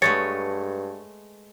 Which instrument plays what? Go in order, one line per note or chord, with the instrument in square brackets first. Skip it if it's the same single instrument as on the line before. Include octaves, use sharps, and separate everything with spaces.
[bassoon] G2 [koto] G#3 A3 B3 [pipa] C#5 [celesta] A6 C#7